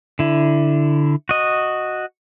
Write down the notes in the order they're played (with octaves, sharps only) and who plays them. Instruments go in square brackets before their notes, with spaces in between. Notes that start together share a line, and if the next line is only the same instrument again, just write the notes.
[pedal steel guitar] D3 E4
F#4 D#5